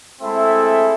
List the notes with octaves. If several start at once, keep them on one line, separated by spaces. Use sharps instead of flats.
G#3 A3 C4 E4 A4 E5